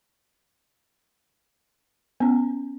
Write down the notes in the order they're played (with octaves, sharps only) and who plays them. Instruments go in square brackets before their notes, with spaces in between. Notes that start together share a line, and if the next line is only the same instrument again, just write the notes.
[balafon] B3 C#4